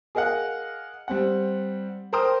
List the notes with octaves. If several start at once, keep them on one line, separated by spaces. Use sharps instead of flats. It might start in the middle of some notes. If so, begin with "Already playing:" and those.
G#4 A#4 D#5 F5 F#5
G3 C4 F#5
A#4 C5 G5 A#5 C6 D#6